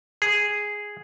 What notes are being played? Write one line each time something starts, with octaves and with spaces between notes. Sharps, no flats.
G#4